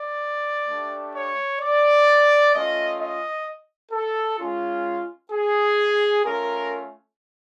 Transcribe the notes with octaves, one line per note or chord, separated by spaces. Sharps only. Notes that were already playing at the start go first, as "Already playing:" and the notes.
Already playing: D5
A3 D4 G4
C#5
D5
A3 C#4 F4 D#5
D#5
A4
G#3 C#4 F4
G#4
A3 C#4 F4 A#4